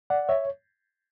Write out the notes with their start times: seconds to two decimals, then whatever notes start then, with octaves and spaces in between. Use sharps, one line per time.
0.10 D5 F#5
0.29 C#5 E5